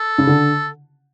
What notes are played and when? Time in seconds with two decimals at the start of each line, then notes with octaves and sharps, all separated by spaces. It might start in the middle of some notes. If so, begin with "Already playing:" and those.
Already playing: A4
0.18 C#3
0.27 D3